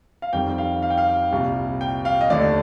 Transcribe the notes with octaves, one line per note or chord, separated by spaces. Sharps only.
F5
F2 D#3 G3 G5
F5
F5
G5
F5
C2 A#2 G3
G5
F5
D#5
D#2 D3 A3 D4 D5